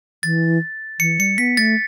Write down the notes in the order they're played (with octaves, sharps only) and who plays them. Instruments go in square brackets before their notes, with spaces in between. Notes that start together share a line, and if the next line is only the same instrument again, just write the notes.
[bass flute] E3 [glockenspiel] A6
[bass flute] E3 [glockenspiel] C#7
[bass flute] G3 [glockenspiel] C#7
[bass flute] B3 [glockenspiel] B6
[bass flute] A3 [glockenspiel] A6